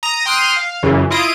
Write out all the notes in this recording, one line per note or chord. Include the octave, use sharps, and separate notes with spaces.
A#5 D#6
G5 C6 D#6 F6 F#6
F5
F#2 C#3 E3
E4 F4 D#5 D#6 D7